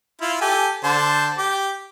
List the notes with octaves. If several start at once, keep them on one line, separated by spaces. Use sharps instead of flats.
E4 F4
G4 A4 G#5
D3 C5 A5
G4 D6